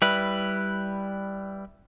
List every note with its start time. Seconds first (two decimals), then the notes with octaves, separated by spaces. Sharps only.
0.02 G3 E4 B4